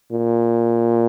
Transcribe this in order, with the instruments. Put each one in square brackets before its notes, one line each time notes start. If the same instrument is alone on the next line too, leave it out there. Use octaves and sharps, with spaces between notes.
[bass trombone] A#2